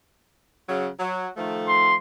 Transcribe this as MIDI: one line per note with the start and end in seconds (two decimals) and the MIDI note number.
0.68 0.88 49
0.68 0.88 54
0.99 1.26 54
1.37 1.94 51
1.37 1.94 53
1.37 1.94 57
1.68 1.95 84